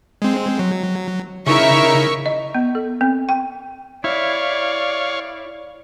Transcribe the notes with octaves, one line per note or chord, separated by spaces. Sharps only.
G#3 C4
F#3
C#3 D#4 E4 A#4 E5 C#6
D#5
B3
A4
C4
G5
E4 C#5 D5 F5